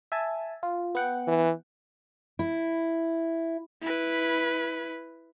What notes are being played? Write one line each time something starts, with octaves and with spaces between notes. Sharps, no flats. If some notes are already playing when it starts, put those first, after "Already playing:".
E5 G#5 A5
F4
B3 F#5 G5
E3
E4
E4 B4